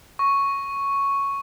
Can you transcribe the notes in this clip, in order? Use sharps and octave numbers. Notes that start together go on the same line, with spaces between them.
C#6